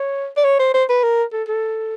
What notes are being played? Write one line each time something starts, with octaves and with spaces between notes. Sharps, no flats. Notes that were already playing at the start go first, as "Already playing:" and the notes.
Already playing: C#5
D5
C#5
C5
C5
B4
A#4
A4
A4